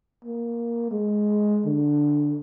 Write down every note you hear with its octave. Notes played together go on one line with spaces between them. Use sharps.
A#3
G#3
D3